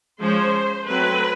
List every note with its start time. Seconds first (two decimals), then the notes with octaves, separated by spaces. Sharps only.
0.19 F3 G#3 C#4 C5
0.87 F#3 A3 C4 B4